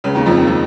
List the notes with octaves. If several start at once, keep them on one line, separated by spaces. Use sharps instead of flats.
C#2 C#3
D#2 D#3
F2 F3
D#2 D#3
F3